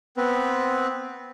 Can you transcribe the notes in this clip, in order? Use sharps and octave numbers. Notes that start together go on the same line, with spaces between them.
B3 C4 B4